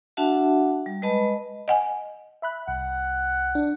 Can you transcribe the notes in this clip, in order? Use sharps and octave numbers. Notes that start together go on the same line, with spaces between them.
D4 F#4 E5 F#5 A5
G3
G#3 B4 D#5 A5 B5
D#5 F#5 G#5
E5 B5 F#6
C2 F#5
D4